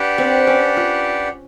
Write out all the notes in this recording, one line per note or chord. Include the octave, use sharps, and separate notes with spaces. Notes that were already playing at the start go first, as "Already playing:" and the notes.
Already playing: D4 G4 B4 D5 F#5
C4
C#4
F4